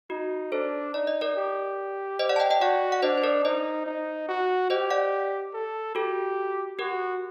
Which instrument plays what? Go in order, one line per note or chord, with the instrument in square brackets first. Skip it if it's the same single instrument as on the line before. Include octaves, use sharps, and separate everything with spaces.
[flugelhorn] D#4 [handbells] F#4
[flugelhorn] D4 [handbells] A4 C5
[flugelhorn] D#4 [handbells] D5
[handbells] D#5
A#4 D5
[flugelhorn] G4
[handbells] C5 D#5
D5 F#5
A5
D#5 G5
D#5 G5
[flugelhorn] F#4 [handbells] D5 F#5
[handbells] F#5
[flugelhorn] D4 [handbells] C5 D#5
[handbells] C5
A#4 D5
[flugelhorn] D#4 [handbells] C5 D#5
[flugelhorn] D#4
F#4
[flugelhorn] G4 [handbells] C5 D#5
[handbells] D5 F#5
[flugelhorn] A4
[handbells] F#4 A4 [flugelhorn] G4
[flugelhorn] F#4 [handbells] G4 A#4